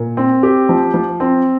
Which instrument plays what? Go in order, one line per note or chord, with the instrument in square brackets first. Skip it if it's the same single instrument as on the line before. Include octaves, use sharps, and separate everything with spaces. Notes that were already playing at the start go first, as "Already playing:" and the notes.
Already playing: [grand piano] A#2
C4
G4
F3
F3
C4